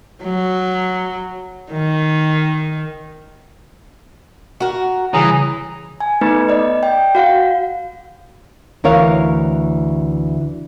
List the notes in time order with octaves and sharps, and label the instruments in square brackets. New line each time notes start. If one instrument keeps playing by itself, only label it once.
[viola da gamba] F#3
D#3
[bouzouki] F#4 A#4
[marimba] C#3 G3 [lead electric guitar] E3 [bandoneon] G#4 A#5
[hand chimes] G#5
A3 B3 D#4 B4
D5 D#5
G5
F#4 F5 F#5
[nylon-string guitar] D2 E3 A#4 C#5 F5